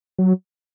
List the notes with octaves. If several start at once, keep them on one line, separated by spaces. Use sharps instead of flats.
F#3